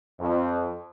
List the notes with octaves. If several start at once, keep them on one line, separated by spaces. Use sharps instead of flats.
F2